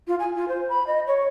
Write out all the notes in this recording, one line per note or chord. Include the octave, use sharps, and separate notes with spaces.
F4
G#5
F4
C5
B5
D#5
C#5